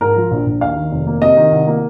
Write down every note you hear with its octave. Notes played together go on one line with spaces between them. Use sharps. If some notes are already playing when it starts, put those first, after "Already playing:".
G#2 A#4
F3
A#1
A#1
D#2 F5
D#3
F1
A#3
C3 D#5
D#3
C2
A#3